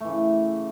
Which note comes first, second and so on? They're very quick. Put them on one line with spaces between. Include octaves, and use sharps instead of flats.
A3 E3 C#3